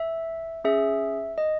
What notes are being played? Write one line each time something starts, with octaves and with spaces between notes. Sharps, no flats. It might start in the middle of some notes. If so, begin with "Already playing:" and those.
Already playing: E5
C#4 G#4 E5
D#5